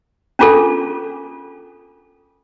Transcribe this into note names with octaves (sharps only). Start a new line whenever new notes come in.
C#4 D4 F4 G#4 A4